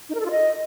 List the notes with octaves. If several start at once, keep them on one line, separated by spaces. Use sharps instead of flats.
D#4
A#4
A4
F4
D#5